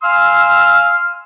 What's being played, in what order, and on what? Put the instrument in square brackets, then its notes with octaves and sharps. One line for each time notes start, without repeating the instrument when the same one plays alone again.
[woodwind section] F5 G#5 C6 E6 F6